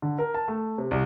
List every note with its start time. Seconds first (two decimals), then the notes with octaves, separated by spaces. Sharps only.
0.02 D3
0.18 A#4
0.34 A5
0.48 A3
0.78 C3
0.91 C2